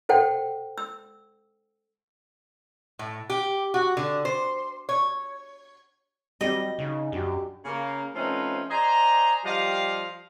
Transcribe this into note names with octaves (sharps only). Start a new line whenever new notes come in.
A4 C5 F#5 G5
E6
A2
G4
F#4
D3
C5
C#5
F#3 G3 C4 G4 D#5
C#3 D#4
F#2 D4 F#4 G4
C#3 A#3
F3 A3 C4 C#4 D#4 B4
C5 D5 D#5 G#5 A#5
F3 G3 G4 D#5 F5